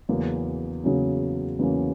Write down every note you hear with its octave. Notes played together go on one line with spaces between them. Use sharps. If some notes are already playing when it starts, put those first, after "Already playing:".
E2 C#3 F#3 A#3 C#4
E2 C#3 F#3 A#3 C#4
E2 C#3 F#3 A#3 C#4